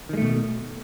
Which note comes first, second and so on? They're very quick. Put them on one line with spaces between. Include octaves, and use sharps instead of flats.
D#3 G#3 A3 B2